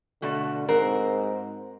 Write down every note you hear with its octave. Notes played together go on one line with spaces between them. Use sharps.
B2 D3 A3 F#4
G#2 C4 F#4 A#4